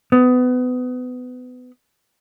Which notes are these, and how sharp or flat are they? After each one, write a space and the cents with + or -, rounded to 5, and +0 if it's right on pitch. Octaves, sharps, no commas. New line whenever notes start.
B3 +25